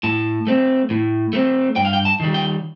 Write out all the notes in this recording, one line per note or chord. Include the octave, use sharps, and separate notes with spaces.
A2 A5
A3 C4
A2
A3 C4
G2 G5
F5
G5
A5
D#3 G3
G5